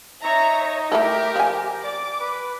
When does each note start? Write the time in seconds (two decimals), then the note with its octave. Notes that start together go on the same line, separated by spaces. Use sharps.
0.24 D#4 C#5 E5 A#5
0.92 A3 E4 G4 A4 A#4
1.36 F3 G#5
1.84 D5 D6
2.20 B4